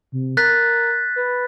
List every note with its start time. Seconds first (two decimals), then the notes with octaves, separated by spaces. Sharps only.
0.12 C3
0.37 A#4 F#6 A6 B6
1.16 B4